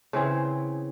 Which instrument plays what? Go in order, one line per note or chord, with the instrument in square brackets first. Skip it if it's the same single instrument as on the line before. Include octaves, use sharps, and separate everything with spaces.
[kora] C#3 E3 C4 G#4